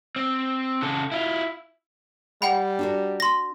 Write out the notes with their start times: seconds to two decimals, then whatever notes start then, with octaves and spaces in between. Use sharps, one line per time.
0.16 C4
0.83 C#3 A4
1.12 E4 F4
2.42 G3 F#5 G5 B5
2.79 D4 F#4 A#4
3.20 C6 A#6